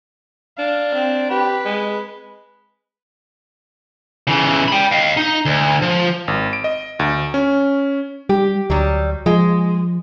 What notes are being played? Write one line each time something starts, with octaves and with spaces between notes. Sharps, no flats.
D4 F5
C4
G4 B4
G#3
C#3 E3
G5 B5
D#5 F5
D#4
D2
F3
G#1
D7
D#5
D2
C#4
G3 G4
D2 F#3 G3
F3 G#3